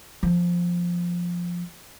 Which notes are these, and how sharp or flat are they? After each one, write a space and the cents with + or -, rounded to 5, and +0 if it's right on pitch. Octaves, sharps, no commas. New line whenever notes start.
F3 +0 B3 -25